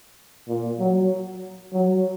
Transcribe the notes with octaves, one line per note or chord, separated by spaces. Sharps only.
A#2
F#3
F#3